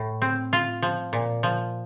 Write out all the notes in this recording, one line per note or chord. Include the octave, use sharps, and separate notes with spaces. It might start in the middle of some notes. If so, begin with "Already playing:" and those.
Already playing: A2
C4
F4
F3
A#2
F3